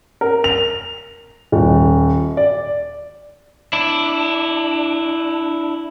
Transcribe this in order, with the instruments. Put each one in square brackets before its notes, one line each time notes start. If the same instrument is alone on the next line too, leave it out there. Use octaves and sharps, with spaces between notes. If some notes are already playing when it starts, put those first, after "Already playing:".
[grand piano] A#4
F7
D#1
D5
[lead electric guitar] D4 E4